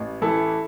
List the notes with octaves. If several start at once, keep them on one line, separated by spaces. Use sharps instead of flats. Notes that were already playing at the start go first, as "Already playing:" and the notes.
Already playing: A1
E3 E4 A4